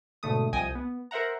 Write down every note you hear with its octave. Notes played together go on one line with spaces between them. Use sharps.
G#2 B2 D3 A3 D#6
C2 F3 D#5 G5 G#5 D#6
B3
A#4 C5 E5 F#5 A#5